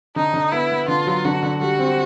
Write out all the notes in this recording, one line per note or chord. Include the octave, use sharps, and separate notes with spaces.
D3 D#4
D3
B3 E4
B3
D3 F4
F#3
D3 F#4
D3
G3 F#4
C4